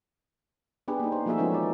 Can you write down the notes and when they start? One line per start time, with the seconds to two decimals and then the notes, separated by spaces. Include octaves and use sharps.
0.88 B3 D4 G4 G#4 B4
1.00 A#3 D#4
1.12 C5
1.26 F3 A3 A#3 F#4 G#4 E5
1.38 F3 G#3 B3 C#4 D#4
1.51 E3 D5